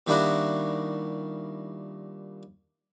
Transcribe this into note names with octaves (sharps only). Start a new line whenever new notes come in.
A#2 D#3 G3 D4 E4 F#4